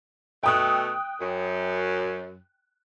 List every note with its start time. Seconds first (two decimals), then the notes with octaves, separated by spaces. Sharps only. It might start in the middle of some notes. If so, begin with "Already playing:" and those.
0.43 B2 A3 G5 D#6 F#6
1.20 F#2